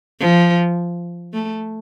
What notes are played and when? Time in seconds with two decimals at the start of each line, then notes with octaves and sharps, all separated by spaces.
0.20 F3
1.33 A3